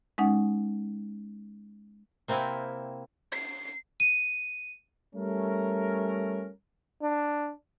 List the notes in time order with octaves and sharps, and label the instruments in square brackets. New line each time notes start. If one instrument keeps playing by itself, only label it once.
[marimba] G#3 C#4 D#4 F#5
[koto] C3 A#3 C4 E4 F#5 G#5
[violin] C7
[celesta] D#7
[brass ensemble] G3 A3 C#4 A#4
[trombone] D4